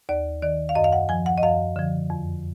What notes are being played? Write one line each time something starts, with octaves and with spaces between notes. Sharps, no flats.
D#2 D5
D#3 D5
F5
F#2 D#5
F5
F#5
F3 G#5
F#5
D#5
F#2 F5
D3 F3
F2